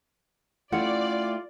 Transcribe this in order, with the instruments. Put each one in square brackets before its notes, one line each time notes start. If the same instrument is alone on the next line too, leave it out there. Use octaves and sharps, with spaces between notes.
[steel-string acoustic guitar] A3 E4 G4 [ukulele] C#4 F#5 [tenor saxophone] F4 [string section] D5